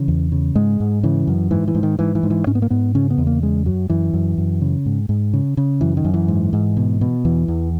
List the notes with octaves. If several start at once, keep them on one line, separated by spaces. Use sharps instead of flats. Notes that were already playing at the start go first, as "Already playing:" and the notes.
Already playing: C#3 E3
E2
C#3
G#2 G#3
G#2
C#3 E3
F#2
G#2 E3
E3
G#2
D#3
G#2 E3
E3
G#2
E3
G#2 C#4
B3
A#3
G#2 B3
C#3 C#4
B3
E2
A#3
C#3 G#3
F#2 F#3
F#2 E3
F#2
F#2
C#3
G#2
G#2
C#3
C#3
F#2 E3
D#3
F#2
E3
G#2
G#2
B2
B2
E2 E3
E2